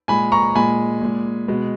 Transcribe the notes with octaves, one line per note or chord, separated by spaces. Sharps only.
A#2 G#3 G#5 B5
A#5 C#6
A#2 G#3 G#5 B5
A#2 G#3
B2 G#3